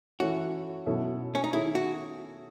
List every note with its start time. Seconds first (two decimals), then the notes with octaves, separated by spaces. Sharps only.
0.20 E3 A3 C#4 E4 F#4
0.86 B2 F#3 C#4 E4 A4
1.35 C#4
1.44 D#4
1.53 D#3 A3 C#4 E4 G#4
1.75 F#4